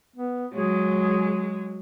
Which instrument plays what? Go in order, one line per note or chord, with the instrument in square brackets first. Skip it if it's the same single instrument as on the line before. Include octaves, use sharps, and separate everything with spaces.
[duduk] B3
[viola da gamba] F#3 G#3 [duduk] G#4